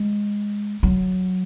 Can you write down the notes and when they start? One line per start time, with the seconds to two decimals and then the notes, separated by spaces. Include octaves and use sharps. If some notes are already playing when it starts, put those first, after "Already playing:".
Already playing: G#3
0.83 F#3